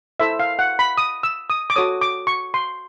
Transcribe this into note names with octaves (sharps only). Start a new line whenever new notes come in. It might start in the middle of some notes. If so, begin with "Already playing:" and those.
E4 A4 C5 E5
F5
F#5
B5
D#6
E6
D#6
D6
F#4 A4 C#5 D#6
D6
C#6
C6